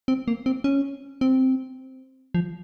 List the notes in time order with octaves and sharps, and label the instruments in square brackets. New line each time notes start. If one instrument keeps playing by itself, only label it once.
[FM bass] C4
A#3
C4
C#4
C4
F3